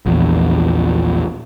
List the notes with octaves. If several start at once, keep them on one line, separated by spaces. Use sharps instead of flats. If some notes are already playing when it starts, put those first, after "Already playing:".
A#1 E2